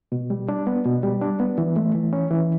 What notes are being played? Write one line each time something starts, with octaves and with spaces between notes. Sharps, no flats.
B2
G3
D4
B3
B2
G3
D4
B3
E3
A3
E3
C#4
E3